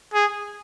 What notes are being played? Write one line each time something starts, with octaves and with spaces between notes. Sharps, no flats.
G#4